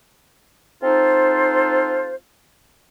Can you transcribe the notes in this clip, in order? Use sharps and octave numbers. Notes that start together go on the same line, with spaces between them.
C4 D#4 F4 A4 C5